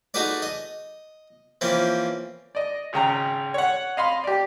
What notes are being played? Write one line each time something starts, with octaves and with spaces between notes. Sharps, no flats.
D#4 F#4 G#4 A4 B4 D5
D#5
E3 F3 A#3 C4 C#4
D5 D#5
G#1 C#3 G5 A#5
C#5 F#5
D#5 F5 B5 C6
G4 D5